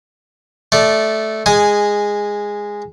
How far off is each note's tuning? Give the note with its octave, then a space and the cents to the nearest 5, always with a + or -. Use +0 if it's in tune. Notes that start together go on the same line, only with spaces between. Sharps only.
A3 -10 D5 +0
G#3 -10 G#5 +0 D#6 +0